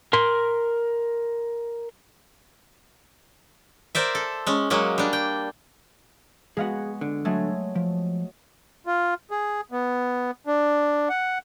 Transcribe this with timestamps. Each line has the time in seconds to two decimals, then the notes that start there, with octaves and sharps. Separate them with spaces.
0.13 A#4 C6
3.95 A#4 C5 D5 E5
4.15 A4
4.47 G#3 C#4
4.70 F#3 G#3 A#3 C#4
4.98 G3 D4
5.13 G5
6.57 G#3 B3 F#4 G#4 F5 F#5
7.01 D3
7.25 F#3 G#3 A3
7.75 F3
8.86 F4
9.31 G#4
9.72 B3
10.47 D4
11.09 F#5